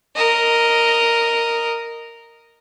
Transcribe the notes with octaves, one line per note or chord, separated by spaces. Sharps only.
A#4 D#5